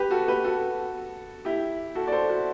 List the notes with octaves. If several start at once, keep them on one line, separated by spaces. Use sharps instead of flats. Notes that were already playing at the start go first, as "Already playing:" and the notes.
Already playing: G4 B4
F#4 A4
G4 B4
F#4 A4
E4 G4
F#4 A4
D5
A4 C5
F#4